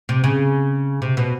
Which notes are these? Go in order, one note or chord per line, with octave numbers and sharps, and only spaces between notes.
C3
C#3
C3
B2